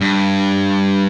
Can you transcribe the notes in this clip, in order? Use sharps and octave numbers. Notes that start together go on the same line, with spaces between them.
G2